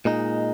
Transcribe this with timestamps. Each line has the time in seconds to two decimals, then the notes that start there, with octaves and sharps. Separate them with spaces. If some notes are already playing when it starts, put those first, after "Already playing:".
0.05 A#2 G#3 D#4